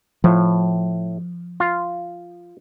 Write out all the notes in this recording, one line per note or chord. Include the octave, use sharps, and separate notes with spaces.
A2 F3
F4